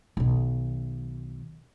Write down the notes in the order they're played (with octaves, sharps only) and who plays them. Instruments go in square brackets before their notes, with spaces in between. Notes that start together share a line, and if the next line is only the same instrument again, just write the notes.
[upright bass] B1 D#3